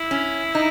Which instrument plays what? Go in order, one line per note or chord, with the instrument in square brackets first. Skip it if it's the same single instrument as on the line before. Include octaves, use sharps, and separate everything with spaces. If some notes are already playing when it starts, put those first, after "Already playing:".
Already playing: [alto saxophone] E4
[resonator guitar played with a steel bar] C#4
D#4